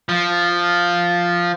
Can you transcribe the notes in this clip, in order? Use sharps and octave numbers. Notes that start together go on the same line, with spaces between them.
F3